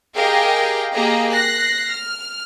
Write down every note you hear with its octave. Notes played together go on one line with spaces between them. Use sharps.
G4 G#4 A#4 D#5 F5 G5
A#3 G4 G#4 D#5 A#5
F#6 A#6 C7
F6